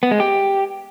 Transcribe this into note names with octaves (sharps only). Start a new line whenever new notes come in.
B3
G#3
G4